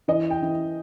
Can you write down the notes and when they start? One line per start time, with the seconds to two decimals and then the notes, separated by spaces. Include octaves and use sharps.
0.08 E3 D#5
0.30 G5
0.42 E3